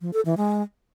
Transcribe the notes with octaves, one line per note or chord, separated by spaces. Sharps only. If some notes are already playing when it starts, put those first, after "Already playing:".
F3
A4
E3
G#3